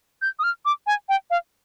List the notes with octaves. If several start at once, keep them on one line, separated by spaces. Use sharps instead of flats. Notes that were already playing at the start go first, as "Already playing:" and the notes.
G6
D#6
F6
D6
G#5
G5
F5